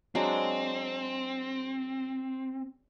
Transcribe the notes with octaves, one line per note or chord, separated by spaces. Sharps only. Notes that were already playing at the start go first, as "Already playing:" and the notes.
F#3 G#3 C4 D4